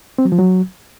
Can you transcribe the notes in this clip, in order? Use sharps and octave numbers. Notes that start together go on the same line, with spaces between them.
C4
F#3
F3
F#3